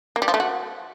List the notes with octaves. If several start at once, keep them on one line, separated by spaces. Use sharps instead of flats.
A#3
G3
F3
A3
F#4